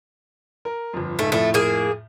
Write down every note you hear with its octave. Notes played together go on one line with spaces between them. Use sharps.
A#4
G1 F2
C#2 G#2 A3
F2 A2 A3
A#3 G#4